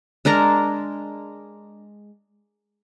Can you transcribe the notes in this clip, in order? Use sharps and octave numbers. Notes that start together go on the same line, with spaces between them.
G#3 D4 A#4 A#5